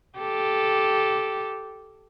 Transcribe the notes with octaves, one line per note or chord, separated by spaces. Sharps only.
G4 A4